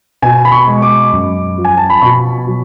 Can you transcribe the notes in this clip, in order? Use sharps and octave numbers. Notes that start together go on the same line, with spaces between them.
B2 G#5
B5
C#6
G#3
D6
F#2
F3
G#5
A5
B5
B2 C#6
F#3